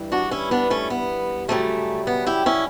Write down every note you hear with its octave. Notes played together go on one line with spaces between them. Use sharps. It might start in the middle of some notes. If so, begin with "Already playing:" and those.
Already playing: G2 E3 G3
D4 F#4
C#4 E4
B3 D4
A3 C#4
B3
F#2 C#3 G3 A3
B3
E4 G4
C#4 E4